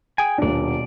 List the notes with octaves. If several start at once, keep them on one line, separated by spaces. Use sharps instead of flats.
G#4 G5 G#5
D#1 B2 D4 D5